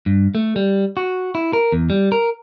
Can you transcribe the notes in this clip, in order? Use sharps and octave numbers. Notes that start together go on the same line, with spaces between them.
G2
A3
G3
F#4
E4
A#4
E2
G3
A#4